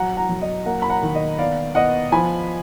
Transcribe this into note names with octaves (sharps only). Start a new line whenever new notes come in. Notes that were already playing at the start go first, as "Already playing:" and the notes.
Already playing: F#3 F#5 A#5
F#5 A#5
F#3
D#5
A#3 F#5 A#5
B5
F#5 A#5
D#3
D#5
B3 D5 F5
B3 D#5 F#5
F3 G#5 B5